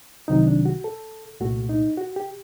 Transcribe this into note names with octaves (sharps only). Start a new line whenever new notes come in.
C2 C3 D#3 F#3 D#4
D4
F#4
A4
C2 A#2 A3 F#4
D#4
F#4
G4